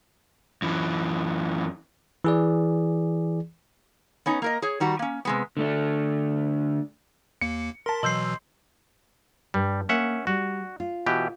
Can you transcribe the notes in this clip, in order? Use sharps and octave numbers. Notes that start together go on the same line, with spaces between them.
F#2 E3
E3 G#4 D5
B3 C#4 D#4
A#3 A#4 D#5
G#4 C#5
D#3 G3 F#4 A#5
A#3 C#4
C3 G#3 B3
D3 A3 D4
D#2 A#3 C#7
A#4 A5 C6 B6
B2 E3 F#3 D#5 C6 E6 G6 C7
G2 G3
A#3 C#4 E5 F#5
G3 F#4
F4
B2 E3 G4